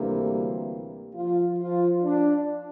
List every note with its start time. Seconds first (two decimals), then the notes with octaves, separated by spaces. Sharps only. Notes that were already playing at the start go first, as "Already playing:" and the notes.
Already playing: D2 C3 E3 G3 A#3
1.15 F3 F4
1.59 F3 F4
2.03 D4